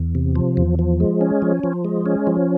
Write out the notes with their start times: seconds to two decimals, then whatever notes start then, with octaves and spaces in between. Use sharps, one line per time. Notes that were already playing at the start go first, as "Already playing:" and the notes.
Already playing: E2
0.15 C3
0.36 F3
0.57 E2
0.79 F3
1.00 G#3
1.21 C#4
1.42 F3
1.64 F3
1.85 G#3
2.06 C#4
2.27 F3